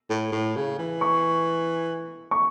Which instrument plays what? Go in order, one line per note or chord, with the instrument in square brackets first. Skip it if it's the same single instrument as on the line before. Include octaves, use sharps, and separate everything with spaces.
[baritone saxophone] A2
A2
C#3
E3
[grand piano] C#6
C#6